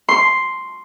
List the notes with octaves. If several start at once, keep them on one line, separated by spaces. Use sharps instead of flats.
C6